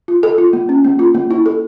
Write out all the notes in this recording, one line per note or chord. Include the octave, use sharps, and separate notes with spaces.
F4
A4
F4
A#3
C#4
A#3
F4
A#3
E4
A4